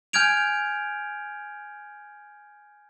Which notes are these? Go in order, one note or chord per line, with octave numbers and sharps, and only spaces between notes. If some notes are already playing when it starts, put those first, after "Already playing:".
G#5 F6 G6 G#6 D7 F7